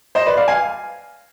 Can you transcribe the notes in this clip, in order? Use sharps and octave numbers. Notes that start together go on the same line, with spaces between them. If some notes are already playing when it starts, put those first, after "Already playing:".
C5 D#5
B4 D5
D5 F5
F5 G#5